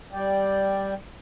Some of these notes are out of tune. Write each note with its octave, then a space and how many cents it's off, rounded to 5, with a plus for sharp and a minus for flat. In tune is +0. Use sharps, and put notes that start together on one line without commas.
G3 -5 D5 +0 G5 +0